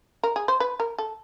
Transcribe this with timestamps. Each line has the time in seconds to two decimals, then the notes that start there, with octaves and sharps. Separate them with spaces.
0.23 A#4
0.36 G#4
0.48 C5
0.60 B4
0.80 A#4
0.98 A4